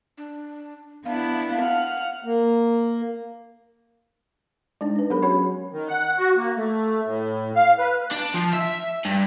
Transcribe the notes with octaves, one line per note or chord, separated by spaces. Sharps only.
D4
B3 D4 E4 F5
F#5 F6
A#3
G#3 D4 D#4
D4 B4
F#3 B3 G4 G#4 A#4 B5
C#4 F#4 C#5 F#5 B5
D#3
F#5
F#4
A#3
A3
A2
F5
B4
D4
F3
E5
G2